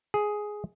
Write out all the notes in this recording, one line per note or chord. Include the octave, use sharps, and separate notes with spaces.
G#4